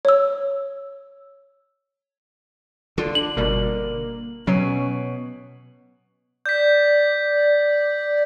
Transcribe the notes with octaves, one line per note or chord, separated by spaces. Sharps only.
C#5 E6
D3 F4 A4
D4 F#7
G1 B2 G3 A#3
B2 F#3 C#4
D5 G6 B6